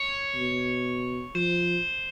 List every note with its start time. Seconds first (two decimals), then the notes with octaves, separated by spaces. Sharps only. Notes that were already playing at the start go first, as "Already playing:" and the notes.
Already playing: C#5
0.35 B2
1.35 F3 C5